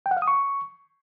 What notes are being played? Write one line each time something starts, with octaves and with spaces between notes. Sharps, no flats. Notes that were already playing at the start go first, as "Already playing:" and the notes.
G5
F#5
F5
D#6
C#6